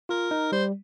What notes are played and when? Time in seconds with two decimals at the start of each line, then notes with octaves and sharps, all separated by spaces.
0.09 F4 A#4
0.31 D#4
0.52 G3 C5